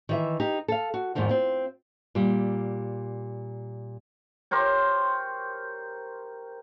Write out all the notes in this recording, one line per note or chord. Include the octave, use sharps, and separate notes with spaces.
D#3 E3 E5
D#4 G4
A4 F5
F#4
E2 G#2 D#3 F3 F4
C4 F4
A#2 G3
G4 A#4 C5 C#5